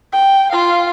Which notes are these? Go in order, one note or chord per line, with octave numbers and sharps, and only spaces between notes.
G5
F4 F5